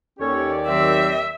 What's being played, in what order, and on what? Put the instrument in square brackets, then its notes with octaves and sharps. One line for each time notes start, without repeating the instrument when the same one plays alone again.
[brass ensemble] D#2 G4 D5 [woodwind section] C#4 A4 C#5
[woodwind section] D#3 F#3 C4 [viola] E5